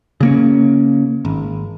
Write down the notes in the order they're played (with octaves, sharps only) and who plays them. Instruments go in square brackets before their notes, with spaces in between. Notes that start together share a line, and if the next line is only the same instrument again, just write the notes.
[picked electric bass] C#3 A#3 C#4
G#1